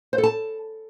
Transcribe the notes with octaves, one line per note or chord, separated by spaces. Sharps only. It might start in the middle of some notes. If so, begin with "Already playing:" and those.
C5
A4
A5